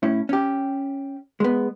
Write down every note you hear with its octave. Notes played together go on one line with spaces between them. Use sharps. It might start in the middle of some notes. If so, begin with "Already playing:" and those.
A2 C#4 E4
C#4 G4
G#3 B3